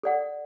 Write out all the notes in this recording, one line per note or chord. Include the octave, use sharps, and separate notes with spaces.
A4 D5 F#5